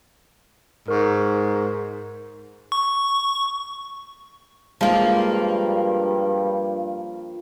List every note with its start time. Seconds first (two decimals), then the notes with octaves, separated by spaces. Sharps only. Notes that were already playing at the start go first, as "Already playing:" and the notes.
0.88 G#2 A#4 C#6
2.72 C#6
4.81 G2 F3 G#3 A#3 F4